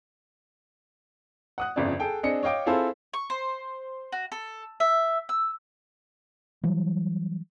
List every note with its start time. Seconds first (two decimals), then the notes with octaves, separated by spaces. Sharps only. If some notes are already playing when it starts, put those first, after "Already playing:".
1.58 F#5 D#6 F#6
1.76 G1 F2 C#3 D5
2.00 G#4 A4 G5
2.23 C4 D4 G#4 D#5 C#7
2.43 C#5 D#5 F5 G5 D6
2.66 C4 E4 F4 G#4 A4 C5
3.13 C#6
3.30 C5
4.12 F#4
4.32 A4
4.80 E5
5.29 E6
6.64 E3 F#3 G3